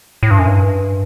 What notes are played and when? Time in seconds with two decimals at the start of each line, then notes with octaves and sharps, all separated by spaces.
0.23 A2
0.31 G2
0.39 F#2
0.46 G2